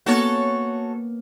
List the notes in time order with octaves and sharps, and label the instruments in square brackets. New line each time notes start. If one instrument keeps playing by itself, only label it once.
[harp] A#3 B3 C#4 [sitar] F#4 A4 C#5